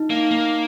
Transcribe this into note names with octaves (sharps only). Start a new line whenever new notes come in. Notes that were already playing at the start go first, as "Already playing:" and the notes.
Already playing: D#4
A#3
A#3